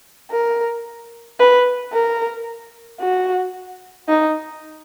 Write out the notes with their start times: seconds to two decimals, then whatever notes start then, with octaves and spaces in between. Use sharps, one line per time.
0.31 A#4
1.39 B4
1.93 A#4
3.01 F#4
4.08 D#4